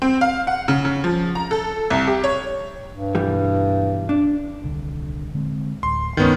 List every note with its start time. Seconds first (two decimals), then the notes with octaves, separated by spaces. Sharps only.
0.02 C4
0.21 F5
0.47 F#5
0.68 C#3
0.85 C#3
1.04 F3
1.35 A#5
1.51 A4
1.90 C2
2.07 G4
2.24 C#5
2.91 G2
3.15 B1 E3 G3
4.09 D4
4.64 D#1 C2 D3
5.34 D3 G#3 C4
5.83 D1 C6
6.17 C2 G2 D#3 G#3 B3 C#4